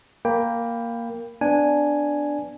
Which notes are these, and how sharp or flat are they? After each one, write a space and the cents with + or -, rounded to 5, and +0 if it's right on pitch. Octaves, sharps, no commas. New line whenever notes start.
A#3 +0 G5 +15 B5 +0
B3 +30 D4 +0 G#5 +0